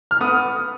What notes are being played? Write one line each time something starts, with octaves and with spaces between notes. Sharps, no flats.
F6
B3 D#6